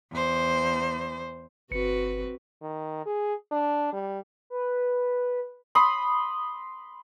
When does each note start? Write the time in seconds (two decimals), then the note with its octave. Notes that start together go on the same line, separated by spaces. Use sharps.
0.12 E2 C5
1.71 G1 C4 F#4 B4 C#7
2.62 D#3
3.06 G#4
3.51 D4
3.93 G3
4.50 B4
5.75 B5 C6 D#6